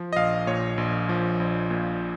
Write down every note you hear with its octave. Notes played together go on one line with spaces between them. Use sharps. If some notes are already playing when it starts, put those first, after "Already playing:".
Already playing: F3
D#5
A#1 F5
A#2 C#5
A#1
F3
A#1
A#2